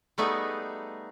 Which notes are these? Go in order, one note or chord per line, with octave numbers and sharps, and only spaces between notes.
G3 A3 B3 D#4 G#4